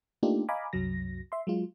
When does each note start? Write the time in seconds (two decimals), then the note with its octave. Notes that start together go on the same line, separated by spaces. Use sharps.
0.23 A3 A#3 D4 D#4 F4 G4
0.49 D#5 F5 G#5 A#5 B5 D6
0.73 C2 F#2 F#3 A#6
1.32 E5 C6
1.47 F#3 G#3 F4